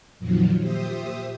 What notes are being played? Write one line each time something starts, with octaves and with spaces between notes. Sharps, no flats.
F2 A#2 D#3 F3 F#3
A#2 G4 C5 E5 D#6